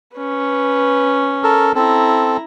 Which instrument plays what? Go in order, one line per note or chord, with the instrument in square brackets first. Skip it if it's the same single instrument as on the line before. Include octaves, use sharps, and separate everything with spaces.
[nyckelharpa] C#4 B4
[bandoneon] A4 A#4
[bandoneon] C4 A4 [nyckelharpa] E4 A#5